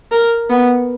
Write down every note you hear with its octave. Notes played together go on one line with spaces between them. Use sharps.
A#4
B3